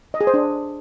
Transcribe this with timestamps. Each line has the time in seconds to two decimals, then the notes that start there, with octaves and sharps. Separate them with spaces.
0.14 D#5
0.21 G#4
0.27 C5
0.34 D4